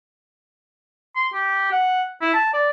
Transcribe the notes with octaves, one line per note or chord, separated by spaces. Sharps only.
C6
G4
F#5
E4
A5
D5